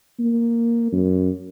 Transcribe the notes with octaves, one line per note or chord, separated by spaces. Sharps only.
A#3
F#2